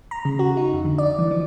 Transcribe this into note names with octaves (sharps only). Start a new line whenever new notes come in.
A#5
C#3
F#4
D#4
F2
D3
D5
E3
F3